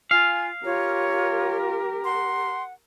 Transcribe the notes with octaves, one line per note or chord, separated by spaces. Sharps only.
F4 F5 G#5
F4 G4 A#4 C#5
F#5 C6